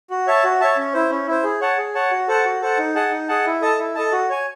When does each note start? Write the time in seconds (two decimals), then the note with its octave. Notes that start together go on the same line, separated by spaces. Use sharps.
0.10 F#4
0.27 C#5 E5 A5
0.44 F#4
0.60 C#5 E5 A5
0.77 C#4
0.94 E4 C5
1.10 C#4
1.27 E4 C5
1.43 G#4
1.61 C#5 F#5 A5
1.78 G#4
1.95 C#5 F#5 A5
2.11 F#4
2.28 A4 C5 F#5 A5
2.45 F#4
2.61 A4 C5 F#5 A5
2.78 D#4
2.95 G#4 D#5 F#5 A5
3.11 D#4
3.28 G#4 D#5 F#5 A5
3.46 E4
3.62 A4 D#5 A5
3.79 E4
3.95 A4 D#5 A5
4.12 F#4
4.29 C#5 G#5